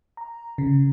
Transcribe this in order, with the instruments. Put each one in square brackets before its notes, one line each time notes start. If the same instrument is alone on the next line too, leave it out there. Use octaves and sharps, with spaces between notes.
[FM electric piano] A#5
C#3